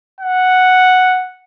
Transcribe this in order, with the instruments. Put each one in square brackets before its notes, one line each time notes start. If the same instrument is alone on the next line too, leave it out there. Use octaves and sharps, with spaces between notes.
[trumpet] F#5